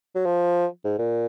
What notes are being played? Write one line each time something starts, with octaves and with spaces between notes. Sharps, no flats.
F#3
F3
G#2
A#2